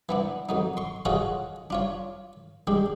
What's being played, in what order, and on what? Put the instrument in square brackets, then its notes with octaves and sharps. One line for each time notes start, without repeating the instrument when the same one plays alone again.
[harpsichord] E3 B3 D4
F2 F#3 D#4
C6 C#6
F4 F#4 G#4 A4 C#5 D#5
D4 F4 C#5
G#3 D4 G4